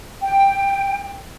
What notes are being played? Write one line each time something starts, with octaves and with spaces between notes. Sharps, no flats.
G5